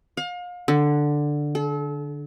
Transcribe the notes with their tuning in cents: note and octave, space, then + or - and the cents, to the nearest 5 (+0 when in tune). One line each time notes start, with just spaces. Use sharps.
F5 +35
D3 +5
A4 -35